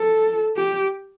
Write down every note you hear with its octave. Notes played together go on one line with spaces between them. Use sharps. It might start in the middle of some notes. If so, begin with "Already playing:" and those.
Already playing: A4
G4